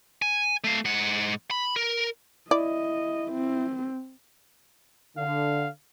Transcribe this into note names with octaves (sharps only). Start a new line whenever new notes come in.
G#5
A3 F5
G#2 F#5
B5
A#4
E4 D5 D#5
C4
D3 F5